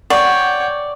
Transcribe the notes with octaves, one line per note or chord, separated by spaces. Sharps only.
C#5 D5 F#5 G5 C#6